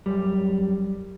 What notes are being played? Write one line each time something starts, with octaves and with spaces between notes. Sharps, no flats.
F#2 G3